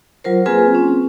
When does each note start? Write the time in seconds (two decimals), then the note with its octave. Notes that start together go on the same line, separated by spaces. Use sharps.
0.24 F#3 F4 A#4 C5
0.46 A#3 C4 F4 G#4 B4 G#5
0.74 C4 C#4